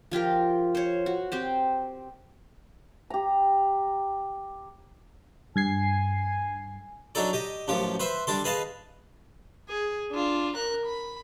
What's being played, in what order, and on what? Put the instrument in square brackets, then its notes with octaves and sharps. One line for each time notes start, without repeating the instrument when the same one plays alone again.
[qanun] F3 F4 G4 A#4
C5 C#5
F#4
C4 G4 C5
[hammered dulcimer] G4 A#5
[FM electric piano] G2 G#6 C7 [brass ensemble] G#5
[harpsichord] F#3 D4 D#4 A4 D5
G4 D#5
A1 F#2 F3 G4
B4 C5 E5
G3 D4 A4 C6
G#4 B4 D#5 F5 A5
[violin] G#4
D4 F4
A#4 F#6
B5